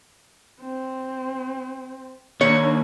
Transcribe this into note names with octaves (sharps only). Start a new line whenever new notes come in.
C4
D#2 A#3 D4 C#5